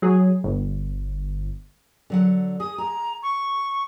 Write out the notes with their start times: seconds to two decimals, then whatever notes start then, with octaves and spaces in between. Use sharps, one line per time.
0.02 F#3 G#4
0.44 G1
2.10 D3 F#3 F#5
2.60 G#4 D#6
2.78 G#4 A#5
3.23 C#6